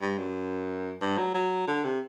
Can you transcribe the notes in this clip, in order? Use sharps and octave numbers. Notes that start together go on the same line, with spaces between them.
G2
F#2
G2
F#3
F#3
D3
C3